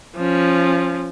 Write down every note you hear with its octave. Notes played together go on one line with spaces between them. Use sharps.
F3 C#4